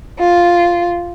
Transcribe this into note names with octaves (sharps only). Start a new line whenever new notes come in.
F4